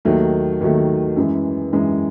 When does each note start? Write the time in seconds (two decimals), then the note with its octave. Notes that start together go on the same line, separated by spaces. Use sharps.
0.05 D#2 D#3 F#3 A3
0.61 D#2 D#3 F#3 A3
1.17 F#2 E3 G#3
1.73 F#2 E3 G#3